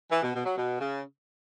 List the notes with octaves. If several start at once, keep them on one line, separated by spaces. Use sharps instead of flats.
E3
B2
B2
F#3
B2
C#3